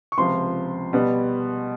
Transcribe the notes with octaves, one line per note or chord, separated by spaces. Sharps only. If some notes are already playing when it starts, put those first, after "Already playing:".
C#6
C#2 C3 F3 C6
B2 G3 B3